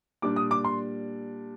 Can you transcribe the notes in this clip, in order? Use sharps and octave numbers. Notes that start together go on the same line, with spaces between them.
A#2 G3 D4 D6
D#6
D6
C6